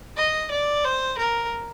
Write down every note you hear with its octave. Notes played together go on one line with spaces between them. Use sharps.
D#5
D5
C5
A#4